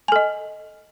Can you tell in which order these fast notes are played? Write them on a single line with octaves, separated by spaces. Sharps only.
G#5 A4 D#5